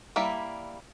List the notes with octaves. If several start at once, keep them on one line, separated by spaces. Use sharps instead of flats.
G3 A#3 E4